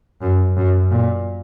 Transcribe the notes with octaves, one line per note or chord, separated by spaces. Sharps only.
F#2
F#2
A#2